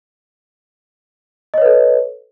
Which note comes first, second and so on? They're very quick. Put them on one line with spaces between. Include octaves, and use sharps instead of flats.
D#5 C#5 B4 A4